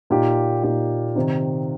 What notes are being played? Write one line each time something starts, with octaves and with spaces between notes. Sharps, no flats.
A#2 A#3 D#4 G4
A#2 A#3 D#4 G4
C3 D#3 C4 D#4